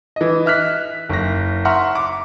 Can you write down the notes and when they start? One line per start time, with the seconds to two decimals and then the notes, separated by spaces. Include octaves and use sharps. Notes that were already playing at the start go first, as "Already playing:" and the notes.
0.16 E3 D#5
0.46 E5 F6 F#6 B6
1.09 F#1 A#6
1.65 E5 F#5 A#5 C6 C#6 F6
1.95 D6